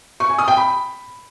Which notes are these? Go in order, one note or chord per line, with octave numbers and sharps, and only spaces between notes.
C#6
G#5
D#6
G5
B5